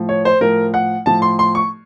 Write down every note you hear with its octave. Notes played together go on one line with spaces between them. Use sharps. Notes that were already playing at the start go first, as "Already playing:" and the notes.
Already playing: A2 F3
C#5
C5
A2 F3 A#4
F#5
A2 F3 A5
C6
C6
C#6